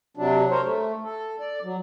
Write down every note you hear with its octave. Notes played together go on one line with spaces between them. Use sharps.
C3 F#3 D4
A#4 C5 C#5
A3
A4
D5
F#3